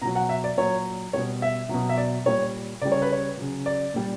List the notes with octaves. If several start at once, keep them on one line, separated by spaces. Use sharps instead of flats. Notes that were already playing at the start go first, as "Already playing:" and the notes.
B2 F#3 A#5
F#5
E5
D5
A#2 F#3 C#5
B2 G3 C#5
E5
B2 F#3
E5
D5
A#2 G3 C#5
C#3 G3 D5
C#5
B4
C#5
C#3 F#3
D5
A#2 G3